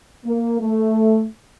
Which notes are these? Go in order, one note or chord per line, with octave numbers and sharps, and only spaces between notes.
A#3
A3